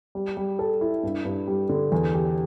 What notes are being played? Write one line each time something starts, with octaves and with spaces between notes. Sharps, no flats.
G3
G3
A4
E4
G2
G2
G3
D3
E2
G4